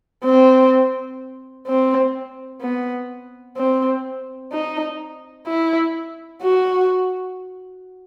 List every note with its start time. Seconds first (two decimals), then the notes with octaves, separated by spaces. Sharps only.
0.25 C4
1.67 C4
2.62 B3
3.57 C4
4.52 D#4
5.47 E4
6.42 F#4